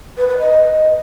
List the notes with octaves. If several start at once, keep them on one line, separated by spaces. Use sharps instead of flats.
B4
B4
D#5